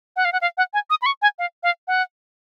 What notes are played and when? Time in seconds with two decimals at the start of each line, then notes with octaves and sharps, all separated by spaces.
0.16 F#5
0.25 F5
0.33 F#5
0.41 F5
0.58 F#5
0.74 G#5
0.90 D#6
1.02 B5
1.06 C#6
1.22 G#5
1.39 F5
1.63 F5
1.88 F#5